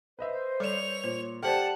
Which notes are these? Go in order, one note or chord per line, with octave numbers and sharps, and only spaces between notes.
B4 C5 D#5 E5
G3 A4 C#5 D5 F7
A#2 C5
G4 A4 C5 D5 F#5 G5 A5